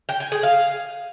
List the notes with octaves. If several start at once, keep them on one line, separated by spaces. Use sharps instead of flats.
G5
G#5
G#4
F5